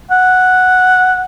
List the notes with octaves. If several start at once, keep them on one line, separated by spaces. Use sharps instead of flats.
F#5